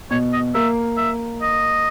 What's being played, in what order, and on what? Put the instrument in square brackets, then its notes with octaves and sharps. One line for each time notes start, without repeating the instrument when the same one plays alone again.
[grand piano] B2 [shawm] C#5
[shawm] D#5
[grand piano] A#3 [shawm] E5
[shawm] E5
D#5